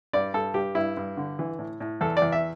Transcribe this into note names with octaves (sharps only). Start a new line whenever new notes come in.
G2 D5
G2 A4
G2 G4
G2 E4
G2
D3
E3
A2
A2
E2 A4
D5
E2
E5